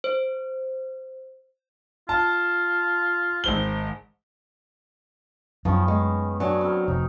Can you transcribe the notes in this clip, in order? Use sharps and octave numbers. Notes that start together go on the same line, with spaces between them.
C5
F4 A5
G#1 C5 G7
F#2 D#3 F3 B3 C#4
G#3 C#6
F#3 D4 G#5
C4 F#4 A#4
F1 D#4